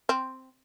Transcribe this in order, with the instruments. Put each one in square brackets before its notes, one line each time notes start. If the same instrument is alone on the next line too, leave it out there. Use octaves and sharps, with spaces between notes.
[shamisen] C4